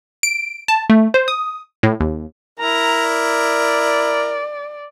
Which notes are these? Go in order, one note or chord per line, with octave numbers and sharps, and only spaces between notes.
D7
A5
A3
C5
D#6
A2
D#2
E4 A#4 A#5
D5